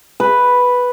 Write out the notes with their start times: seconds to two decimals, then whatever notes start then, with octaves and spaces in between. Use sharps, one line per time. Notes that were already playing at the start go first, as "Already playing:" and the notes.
0.20 B4